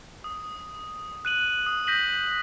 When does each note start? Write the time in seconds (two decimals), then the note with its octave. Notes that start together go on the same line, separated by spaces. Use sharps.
0.24 D#6
1.25 F#6 D#7 F#7
1.66 D#6
1.87 G6 A#6 B6 D#7 F#7